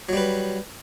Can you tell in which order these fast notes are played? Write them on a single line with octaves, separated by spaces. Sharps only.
F#3 G3 B4